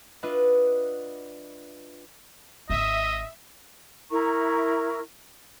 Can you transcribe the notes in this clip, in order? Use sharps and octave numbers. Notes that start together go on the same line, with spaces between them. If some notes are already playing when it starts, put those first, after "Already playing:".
D4 F4 B4 D#5 E5 F#5
G#1 D#4 D#5 E5
E4 A#4 A#5 C#6